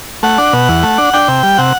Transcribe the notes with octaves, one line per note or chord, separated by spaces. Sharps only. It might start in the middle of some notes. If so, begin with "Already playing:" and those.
A3 F#5
D4
B2
E2
A3
D4
D4 G5
C3
G3
C3 F#5